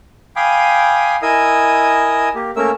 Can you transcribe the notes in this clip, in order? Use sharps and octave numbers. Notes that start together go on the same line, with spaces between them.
F5 G5 G#5 B5 D6 D#6
E4 A#4 D#5 G#5 D#6 E6
A#3 G4
A3 A#3 C#4 A#4 E5 E6